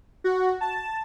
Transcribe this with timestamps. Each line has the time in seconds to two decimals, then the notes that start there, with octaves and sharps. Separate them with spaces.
0.24 F#4
0.61 A5